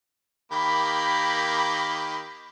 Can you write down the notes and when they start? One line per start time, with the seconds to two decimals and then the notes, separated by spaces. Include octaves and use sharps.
0.52 D#3 A#3 G4 B5